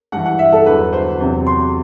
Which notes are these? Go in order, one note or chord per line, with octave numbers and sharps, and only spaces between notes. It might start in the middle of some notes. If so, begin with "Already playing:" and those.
G2 E3 F#5
F#5
E5
A4
E2 D3 F#3 B4
C5
E2 C3 F#3
C6